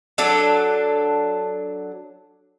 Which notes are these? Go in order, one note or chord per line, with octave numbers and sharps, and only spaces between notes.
F#3 D4 A4